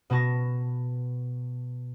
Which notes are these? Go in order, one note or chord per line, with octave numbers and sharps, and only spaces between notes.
B2 B3 F#4 A5 C#6 A#6